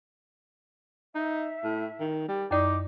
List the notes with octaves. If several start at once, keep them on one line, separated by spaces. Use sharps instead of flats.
D#4 E5
A2
D#3
G3
F#2 D#4 D5 D6